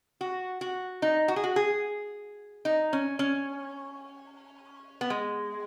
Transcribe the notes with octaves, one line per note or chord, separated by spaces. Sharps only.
F#4
F#4
D#4
F#4
G#4
F#4
G#4
D#4
C#4
C#4
B3
G#3